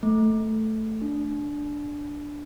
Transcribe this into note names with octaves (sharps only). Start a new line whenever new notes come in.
A3
D4